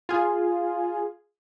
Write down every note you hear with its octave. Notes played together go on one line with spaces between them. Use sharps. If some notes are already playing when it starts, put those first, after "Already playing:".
F4 G#4